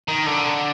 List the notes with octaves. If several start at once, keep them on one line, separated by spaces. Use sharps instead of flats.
D#3
D3